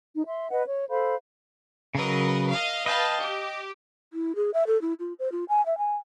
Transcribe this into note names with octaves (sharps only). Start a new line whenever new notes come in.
D#4
E5 C6
B4 D#5 F#5
C#5
A4 C5 F5 B5
C#3 F#3 A#4 B4 D#5
D#5 F5
B4 D#5 F5 G5 A5
G4
E4
G#4
E5
A4
E4
F4
C5
F4
G#5
E5
G#5